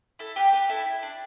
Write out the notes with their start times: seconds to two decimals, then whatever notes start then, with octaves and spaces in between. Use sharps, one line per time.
0.19 E4 A4
0.36 G4 B4
0.52 G4 B4
0.69 E4 A4
0.86 E4
1.03 D4